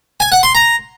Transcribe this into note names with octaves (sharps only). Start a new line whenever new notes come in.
G#5
F#5
C6
A#5